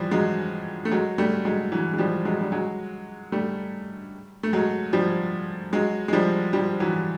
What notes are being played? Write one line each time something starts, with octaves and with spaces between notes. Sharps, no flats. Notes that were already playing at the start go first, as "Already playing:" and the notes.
Already playing: E3 F3 G3
F#3 G#3
A3
F#3 G#3
G3 A3
F#3 G#3
E3 F#3
G#3
F3 G3
F#3 G#3
G3
F#3 G#3
G3 A3
A3
F#3 G#3
F3 G3
F#3 G#3
G#3
F3 G3
F3 G3
E3 F#3